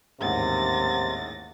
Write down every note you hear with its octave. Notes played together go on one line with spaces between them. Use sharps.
A1 D#2 G#2 C3 A6 A#6